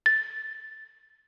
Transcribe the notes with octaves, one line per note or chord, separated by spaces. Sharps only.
A6